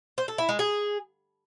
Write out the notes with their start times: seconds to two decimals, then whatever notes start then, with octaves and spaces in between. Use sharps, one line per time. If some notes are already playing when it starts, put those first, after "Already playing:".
0.18 C5
0.28 A4
0.38 E4
0.49 G#3
0.59 G#4